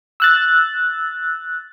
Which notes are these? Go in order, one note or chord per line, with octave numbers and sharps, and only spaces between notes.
E6 F#6 A6